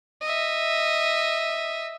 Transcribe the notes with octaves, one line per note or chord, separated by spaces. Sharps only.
D#5 E5